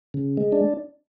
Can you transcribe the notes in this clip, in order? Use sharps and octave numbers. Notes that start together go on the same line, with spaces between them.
C#3
G#3
D4